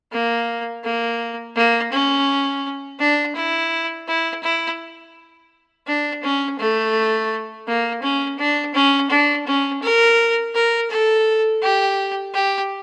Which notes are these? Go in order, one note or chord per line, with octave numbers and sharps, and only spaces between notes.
A#3
A#3
A#3
C#4
D4
E4
E4
E4
D4
C#4
A3
A#3
C#4
D4
C#4
D4
C#4
A#4
A#4
A4
G4
G4